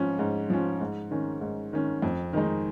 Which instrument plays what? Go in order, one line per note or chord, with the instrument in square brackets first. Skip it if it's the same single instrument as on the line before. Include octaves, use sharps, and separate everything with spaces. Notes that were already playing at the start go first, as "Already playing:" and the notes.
Already playing: [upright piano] G#2 F3 C#4
G#2
F3 C#4
G#2
D#3 C#4
G#2
D#3 C#4
F2
D#3 G#3 D#4